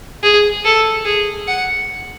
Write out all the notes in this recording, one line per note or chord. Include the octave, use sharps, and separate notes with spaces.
G#4
A4
G#4
F#5